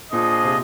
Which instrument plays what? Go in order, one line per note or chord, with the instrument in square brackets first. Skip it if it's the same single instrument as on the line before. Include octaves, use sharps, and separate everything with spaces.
[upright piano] A#2 [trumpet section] D4 F4 G#4 C5 D#5
[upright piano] C3